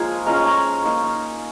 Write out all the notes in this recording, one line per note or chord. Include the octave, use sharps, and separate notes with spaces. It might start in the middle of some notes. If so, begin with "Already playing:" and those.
Already playing: F3 G#3 A#3 D#4 F4 C#5 G#5
G#3 C#4 F4 A#5
C#6
A#5
A#3 D#4